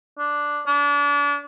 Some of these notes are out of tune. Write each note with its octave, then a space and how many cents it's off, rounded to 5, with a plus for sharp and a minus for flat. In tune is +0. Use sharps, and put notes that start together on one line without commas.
D4 +0
D4 -35